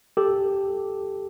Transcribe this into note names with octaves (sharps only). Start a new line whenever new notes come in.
G4 A4